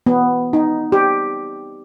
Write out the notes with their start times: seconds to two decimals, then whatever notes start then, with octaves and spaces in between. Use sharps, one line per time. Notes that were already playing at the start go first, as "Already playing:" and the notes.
0.06 B3
0.53 D#4
0.92 G4